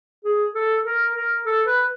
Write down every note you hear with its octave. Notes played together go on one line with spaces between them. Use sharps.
G#4
A4
A#4
A#4
A4
B4